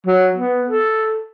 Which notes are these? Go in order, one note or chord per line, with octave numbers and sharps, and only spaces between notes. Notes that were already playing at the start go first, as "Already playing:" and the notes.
F#3
B3
A4